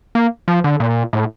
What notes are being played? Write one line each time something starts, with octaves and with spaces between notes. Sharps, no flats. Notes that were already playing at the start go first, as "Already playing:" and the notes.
A#3
F3
D3
A#2
A2